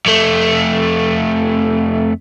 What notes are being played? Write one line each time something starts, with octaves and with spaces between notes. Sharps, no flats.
F2 A3